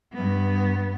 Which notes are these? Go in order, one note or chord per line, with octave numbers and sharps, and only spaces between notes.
G2 B3